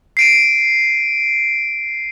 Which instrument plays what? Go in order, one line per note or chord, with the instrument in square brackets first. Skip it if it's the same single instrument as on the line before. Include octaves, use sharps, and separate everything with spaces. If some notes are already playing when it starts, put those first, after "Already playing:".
[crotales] C7 D7 D#7